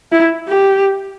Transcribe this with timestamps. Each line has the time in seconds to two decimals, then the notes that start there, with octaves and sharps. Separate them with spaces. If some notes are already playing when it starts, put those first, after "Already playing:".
0.12 E4
0.48 G4